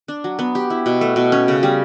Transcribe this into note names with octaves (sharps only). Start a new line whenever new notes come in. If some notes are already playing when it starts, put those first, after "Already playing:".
D4
F#3
B3
G4
E4
B2
A3
B2
C#4
C#3
G3